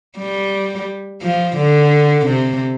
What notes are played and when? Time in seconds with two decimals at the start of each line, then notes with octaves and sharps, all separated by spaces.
0.18 G3
1.22 F3
1.57 D3
2.26 C3